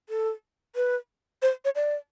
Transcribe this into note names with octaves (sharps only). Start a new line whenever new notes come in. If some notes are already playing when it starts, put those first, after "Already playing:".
A4
B4
C5
C#5
D5